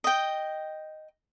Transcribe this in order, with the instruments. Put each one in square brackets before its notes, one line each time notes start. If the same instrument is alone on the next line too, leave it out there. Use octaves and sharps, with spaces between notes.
[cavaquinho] D#5 G5